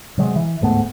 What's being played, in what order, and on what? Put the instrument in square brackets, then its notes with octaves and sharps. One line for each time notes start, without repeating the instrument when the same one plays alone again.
[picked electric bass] C3 F#3 G#3
E3
D1 G#2 A3 B3